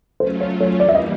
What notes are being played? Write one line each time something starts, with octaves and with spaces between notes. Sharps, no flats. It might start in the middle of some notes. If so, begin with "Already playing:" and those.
F#3 A3 C#4 F4 C5
C#5
C#5
G2 E3 G3 A#3 D5
E5
D#5